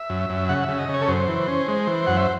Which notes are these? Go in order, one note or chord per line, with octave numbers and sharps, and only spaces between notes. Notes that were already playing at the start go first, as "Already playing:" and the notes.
Already playing: E5
F#2
F#2
C#3 F#5
E5
C#3
D#5
C#3 C#5
A4
F#2 C5
E3
C#4
G#3
E3
F#2 F#5
E5